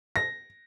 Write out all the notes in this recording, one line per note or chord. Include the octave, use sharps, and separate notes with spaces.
A#6